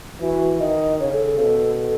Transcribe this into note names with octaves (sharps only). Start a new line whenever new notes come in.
E3 F#4
D#3 D#5
C#3 C#5
A4
A4
B2 A4
A4